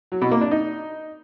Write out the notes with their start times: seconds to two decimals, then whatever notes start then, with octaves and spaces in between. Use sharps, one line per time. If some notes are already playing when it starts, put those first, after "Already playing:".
0.12 F#3
0.22 B2
0.31 A#3
0.41 D4
0.51 D#4